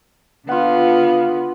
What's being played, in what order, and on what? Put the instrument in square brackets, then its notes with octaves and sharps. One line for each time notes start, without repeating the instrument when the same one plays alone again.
[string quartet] D3 B3 [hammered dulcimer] F4 F#5 [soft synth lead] F5